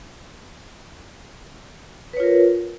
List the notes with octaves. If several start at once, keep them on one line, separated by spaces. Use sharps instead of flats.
F4 A#4 B4 C#5